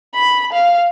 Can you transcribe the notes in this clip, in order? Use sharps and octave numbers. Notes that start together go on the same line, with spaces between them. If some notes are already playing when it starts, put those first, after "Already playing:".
B5
F5